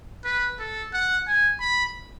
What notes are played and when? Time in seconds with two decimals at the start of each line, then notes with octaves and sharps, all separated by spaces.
0.25 B4
0.59 A4
0.93 F#5
1.28 G#5
1.61 B5